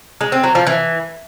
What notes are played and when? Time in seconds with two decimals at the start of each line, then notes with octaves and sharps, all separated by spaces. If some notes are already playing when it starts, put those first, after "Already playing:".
0.21 G#3
0.32 C4
0.44 F#3
0.55 F3
0.67 E3